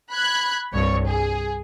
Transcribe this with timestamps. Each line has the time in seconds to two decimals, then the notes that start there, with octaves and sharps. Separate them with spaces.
0.10 B5 F#6 G#6
0.73 C2 G2 C#5
1.06 G#4